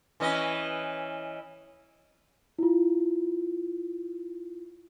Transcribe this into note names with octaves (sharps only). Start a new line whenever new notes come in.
E3 C#4 D#5
E4 F4